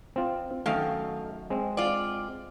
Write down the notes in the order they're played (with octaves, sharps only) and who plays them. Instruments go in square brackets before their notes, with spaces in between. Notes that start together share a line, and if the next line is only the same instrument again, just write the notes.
[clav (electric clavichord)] C4 F4
[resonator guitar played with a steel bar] F#2 D#3 F5 [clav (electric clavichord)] A3 D#5
[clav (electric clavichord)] G#3 C4
[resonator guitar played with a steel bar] F4 D5